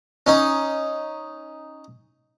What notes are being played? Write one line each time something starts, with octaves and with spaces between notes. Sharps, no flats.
C#4 D#4